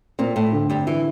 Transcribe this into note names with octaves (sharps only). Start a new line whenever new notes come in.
A#2 A#3 C4
A2 A3
D3
G2 G3
E3 E4